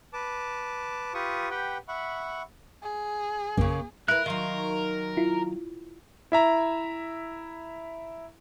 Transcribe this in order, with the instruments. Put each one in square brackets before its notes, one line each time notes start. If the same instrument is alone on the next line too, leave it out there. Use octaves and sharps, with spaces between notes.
[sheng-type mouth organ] B4 A5 D6
F4 G4 B4 C#6 D#6
G4 B4 F#5 G5
E5 F#5 B5 C#6
[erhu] G#4
[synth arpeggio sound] A#1 F#2 [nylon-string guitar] C#3 A#3
[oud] E4 B4 [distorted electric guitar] A#4 [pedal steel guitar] F#6
[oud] D#3 F#3 [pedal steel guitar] D#5 F5 C6
[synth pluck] E4 F4
[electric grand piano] E4 E5 A#5